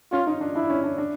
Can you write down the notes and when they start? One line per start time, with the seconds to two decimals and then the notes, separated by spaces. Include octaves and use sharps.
0.12 C#4 F4
0.27 D#4
0.41 D4
0.55 D4 E4
0.70 C#4
0.84 D4
0.98 D4